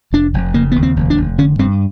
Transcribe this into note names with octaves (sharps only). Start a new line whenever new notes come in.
F1 D4
F1
C#3 A#3
D#2 B3
C4
F1
D4
F1
D3 C#4
G2 C4